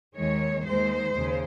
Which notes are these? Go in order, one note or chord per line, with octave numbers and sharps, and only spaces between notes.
D#2 D#3 G#3 C#5
D#2 D#3 G#3 C5
D#2 C#3